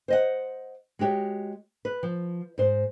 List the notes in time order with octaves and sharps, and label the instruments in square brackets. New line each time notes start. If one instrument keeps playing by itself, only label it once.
[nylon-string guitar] C5 D#5 F#5
G#3 F#4 G4 C#5
B4
F3
G#2 C5